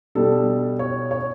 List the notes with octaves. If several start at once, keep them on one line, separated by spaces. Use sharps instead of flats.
B2 G3 D4 A4
C#5
C#5